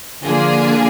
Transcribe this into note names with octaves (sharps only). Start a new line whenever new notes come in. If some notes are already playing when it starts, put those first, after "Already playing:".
D3 F3 A#3 D4 F4 G#4